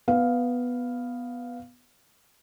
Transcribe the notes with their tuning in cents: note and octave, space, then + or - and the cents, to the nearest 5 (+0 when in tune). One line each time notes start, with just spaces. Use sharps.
B3 +0 F5 +0